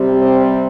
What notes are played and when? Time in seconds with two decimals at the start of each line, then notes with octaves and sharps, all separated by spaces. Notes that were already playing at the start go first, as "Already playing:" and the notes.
Already playing: C3 G3 C4
0.21 C5